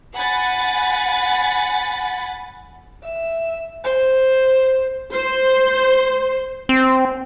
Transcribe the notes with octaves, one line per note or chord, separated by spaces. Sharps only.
F#5 G#5 B5 A6
E5
C5
C5
C4